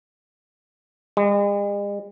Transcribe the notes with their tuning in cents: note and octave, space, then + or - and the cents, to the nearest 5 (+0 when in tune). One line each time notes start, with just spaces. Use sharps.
G#3 -45